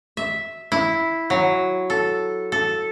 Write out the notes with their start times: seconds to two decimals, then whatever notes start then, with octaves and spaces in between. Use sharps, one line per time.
0.17 E5
0.72 E4
1.30 F#3
1.90 A4
2.52 A4